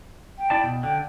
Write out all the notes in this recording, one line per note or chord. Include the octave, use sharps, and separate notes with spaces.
G5
E4 D5 A5
B2
D3 G5